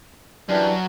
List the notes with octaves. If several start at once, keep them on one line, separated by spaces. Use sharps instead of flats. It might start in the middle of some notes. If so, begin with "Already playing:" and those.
F#2 E3 G3 D4